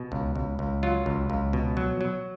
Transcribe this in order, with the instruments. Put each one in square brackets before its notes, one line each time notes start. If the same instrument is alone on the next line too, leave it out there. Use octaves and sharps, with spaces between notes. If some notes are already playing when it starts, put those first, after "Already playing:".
Already playing: [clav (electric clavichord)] B2
C#2
C#2
C#2
F#3 F4
C#2
C#2
B2
F#3
F#3